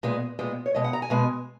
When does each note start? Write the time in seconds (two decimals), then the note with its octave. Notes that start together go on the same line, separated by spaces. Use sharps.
0.03 A#2 G#3 B3
0.39 A#2 G#3 B3
0.66 C#5
0.75 B2 G#3 B3 D#5
0.84 F#5
0.93 A#5
1.02 G#5
1.10 B2 G#3 B3